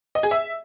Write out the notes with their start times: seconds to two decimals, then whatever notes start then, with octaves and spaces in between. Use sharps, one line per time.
0.15 D#5
0.23 G#4
0.31 E5